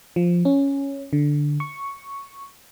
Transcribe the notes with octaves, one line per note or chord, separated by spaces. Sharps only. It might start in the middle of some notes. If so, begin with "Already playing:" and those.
F3
C#4
D3
C#6